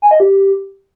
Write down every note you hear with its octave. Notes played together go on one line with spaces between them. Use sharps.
G#5
D#5
G4